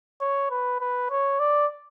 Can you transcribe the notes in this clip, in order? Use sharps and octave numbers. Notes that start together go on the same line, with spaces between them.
C#5
B4
B4
C#5
D5